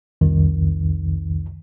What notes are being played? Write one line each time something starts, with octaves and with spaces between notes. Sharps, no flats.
C2 F2 D#3